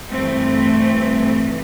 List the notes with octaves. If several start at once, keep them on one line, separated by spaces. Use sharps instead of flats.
G2 E3 A3 C4